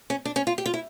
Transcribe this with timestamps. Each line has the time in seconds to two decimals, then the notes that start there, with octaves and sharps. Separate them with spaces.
0.10 C#4
0.25 D4
0.36 C#4
0.47 F4
0.58 G4
0.66 F4
0.74 E4